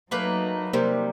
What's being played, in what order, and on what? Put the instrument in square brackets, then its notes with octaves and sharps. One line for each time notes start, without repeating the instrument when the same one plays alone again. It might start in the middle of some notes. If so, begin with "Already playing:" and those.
[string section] F#3 D#4 [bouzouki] A3 A#3 B4
[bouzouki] C3 G3 [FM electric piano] A#3 A#4 C5